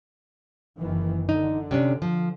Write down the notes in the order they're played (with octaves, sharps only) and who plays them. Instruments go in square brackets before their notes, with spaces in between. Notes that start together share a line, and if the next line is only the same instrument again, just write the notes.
[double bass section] F#1 D#3 E3
[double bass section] D3 [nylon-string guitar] D#4
[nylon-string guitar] C3 C#4 D4
F3